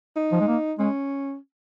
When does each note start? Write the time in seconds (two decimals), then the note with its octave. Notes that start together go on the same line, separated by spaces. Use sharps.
0.16 D#4
0.32 F3
0.40 G#3
0.47 A#3
0.79 G#3 C#4